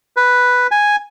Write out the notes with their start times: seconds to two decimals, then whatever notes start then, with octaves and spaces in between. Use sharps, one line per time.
0.17 B4
0.71 G#5